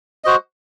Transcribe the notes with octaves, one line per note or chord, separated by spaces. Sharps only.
F#4 C5 D#5